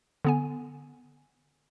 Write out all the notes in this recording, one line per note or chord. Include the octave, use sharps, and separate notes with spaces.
D3 B3 G#5